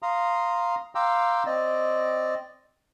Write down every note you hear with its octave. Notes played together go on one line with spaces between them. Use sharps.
F5 A#5 C6 D#6
F5 G5 A#5 C6 D6 E6
C4 D5 D#5